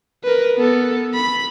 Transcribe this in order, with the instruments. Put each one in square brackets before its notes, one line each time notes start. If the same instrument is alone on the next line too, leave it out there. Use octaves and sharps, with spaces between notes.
[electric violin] A#4 B4
B3 A4
B5